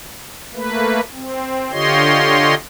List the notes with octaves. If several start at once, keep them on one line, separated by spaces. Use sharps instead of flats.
A3 A#3 B4
C4
D3 F4 G4 C#5 D#5 C6